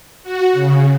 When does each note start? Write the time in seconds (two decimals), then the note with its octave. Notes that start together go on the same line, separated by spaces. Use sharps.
0.23 F#4
0.53 C#3